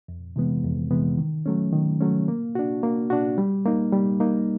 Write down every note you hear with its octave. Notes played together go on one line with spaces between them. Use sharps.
F2
C3 E3 G#3 B3
F2
C3 E3 G#3 B3
D#3
F#3 A3 C#4
D#3
F#3 A3 C#4
A#3
D4 F#4
A#3
D4 F#4
G3
A#3 D#4
G3
A#3 D#4